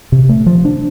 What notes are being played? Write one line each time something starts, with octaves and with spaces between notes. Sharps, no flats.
C3
A3
F3
D4